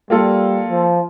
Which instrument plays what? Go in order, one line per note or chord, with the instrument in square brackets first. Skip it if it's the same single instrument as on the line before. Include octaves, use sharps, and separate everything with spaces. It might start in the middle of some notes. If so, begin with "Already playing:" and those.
[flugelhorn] G3 [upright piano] A#3 F4 A4
[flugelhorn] F3